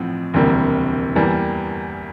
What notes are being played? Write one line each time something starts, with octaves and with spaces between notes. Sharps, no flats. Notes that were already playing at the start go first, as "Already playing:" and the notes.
Already playing: A1 A2 F3 C4
E1 D2 C3 G3 A#3
E2 E3 G3 A#3